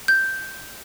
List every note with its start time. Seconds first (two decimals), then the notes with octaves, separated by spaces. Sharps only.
0.08 G6